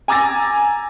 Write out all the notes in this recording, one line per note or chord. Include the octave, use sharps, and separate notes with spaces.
G#5 A#5 D6 E6 A6 A#6